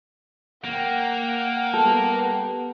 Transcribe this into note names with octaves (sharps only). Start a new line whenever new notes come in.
A#3 F#5 G5
G3 B3 A4